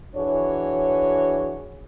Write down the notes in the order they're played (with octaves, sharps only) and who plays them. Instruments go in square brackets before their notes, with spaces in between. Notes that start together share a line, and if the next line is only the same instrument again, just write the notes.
[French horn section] E3 D4 F#4 G#4 C#5